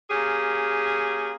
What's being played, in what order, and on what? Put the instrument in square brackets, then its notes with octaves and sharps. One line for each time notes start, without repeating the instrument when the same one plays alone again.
[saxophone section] A#3 C#4 G4 G#4